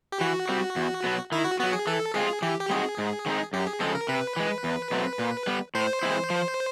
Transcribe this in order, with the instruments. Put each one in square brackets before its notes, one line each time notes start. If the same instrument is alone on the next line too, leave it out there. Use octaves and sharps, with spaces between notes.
[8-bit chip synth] G4
[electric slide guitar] E3 [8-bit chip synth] F#4
[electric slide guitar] G3 C4
E2
B2 F#3 B3
[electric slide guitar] D#3 [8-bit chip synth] E4
[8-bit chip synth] F#4
[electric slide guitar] F#3 B3 [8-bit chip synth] F#4
[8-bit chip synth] G#4
[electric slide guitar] E3 [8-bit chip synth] A4
[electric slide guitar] G#3 C4 F4 [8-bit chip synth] G#4
[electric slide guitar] E3 [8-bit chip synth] G4
[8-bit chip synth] G4
[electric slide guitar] G3 C4 D#4 F#4 [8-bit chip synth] G#4
[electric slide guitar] G#2
D#3 G#3 C4 D#4
[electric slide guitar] F#2 [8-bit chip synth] G4
[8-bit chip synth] G#4
[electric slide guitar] C#3 F3 G#3 C4 [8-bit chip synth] A4
[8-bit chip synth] A#4
[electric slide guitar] C3 [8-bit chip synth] B4
[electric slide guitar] E3 G#3
E2
B2 F#3 A3 C4
A#2
G3 B3
[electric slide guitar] A2 [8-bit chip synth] C5
[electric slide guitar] E3 G#3 C4 E4
F3